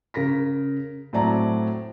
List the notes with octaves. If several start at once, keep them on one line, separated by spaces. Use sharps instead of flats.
C#3 A#4 A#6 B6
A2 F#3 C4 D5 A5 A#5